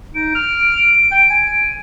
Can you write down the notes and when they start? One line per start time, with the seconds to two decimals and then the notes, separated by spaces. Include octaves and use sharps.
0.15 D#4 D7
0.35 F6
1.12 G5
1.30 G#5